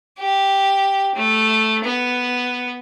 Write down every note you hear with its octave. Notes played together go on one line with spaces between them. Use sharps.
G4
A3
B3